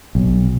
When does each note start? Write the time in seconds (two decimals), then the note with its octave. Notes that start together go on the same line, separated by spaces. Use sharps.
0.15 B1